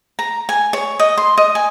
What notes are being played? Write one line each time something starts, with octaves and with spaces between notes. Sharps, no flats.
A#5
G#5
C#5
D#5
C6
D#5
G#5